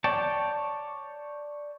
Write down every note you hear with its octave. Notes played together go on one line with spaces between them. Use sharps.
C#5 D5 G5 A5